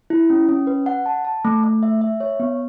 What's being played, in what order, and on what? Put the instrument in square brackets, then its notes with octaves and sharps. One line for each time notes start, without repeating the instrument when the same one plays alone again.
[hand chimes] E4
C#4
C#4
B4
F#5
A5
A5
A3
A3
E5
E5
C#5
B3